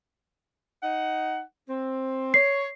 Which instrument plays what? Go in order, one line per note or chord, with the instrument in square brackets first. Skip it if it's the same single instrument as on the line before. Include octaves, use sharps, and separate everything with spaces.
[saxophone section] D#4 F#5
C4
[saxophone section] C#5 [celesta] C7